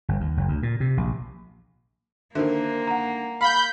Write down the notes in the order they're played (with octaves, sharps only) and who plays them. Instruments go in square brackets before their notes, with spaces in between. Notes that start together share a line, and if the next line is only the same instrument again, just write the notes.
[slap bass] G1
D#2
F#1
D2
A#2
C3
A#1
[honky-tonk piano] D3 D#3 [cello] A#3 [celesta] A#4 C5 E5
[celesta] F#5 A#5
[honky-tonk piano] F5 [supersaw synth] B5 G6